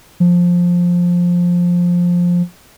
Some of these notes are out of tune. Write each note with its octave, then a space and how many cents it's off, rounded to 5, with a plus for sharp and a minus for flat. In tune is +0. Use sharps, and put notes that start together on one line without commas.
F3 +10